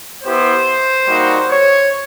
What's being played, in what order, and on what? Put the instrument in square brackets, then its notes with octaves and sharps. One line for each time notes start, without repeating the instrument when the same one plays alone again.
[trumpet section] B3 E4 G4 C5
G3 A#3 D#4 F#4
C#5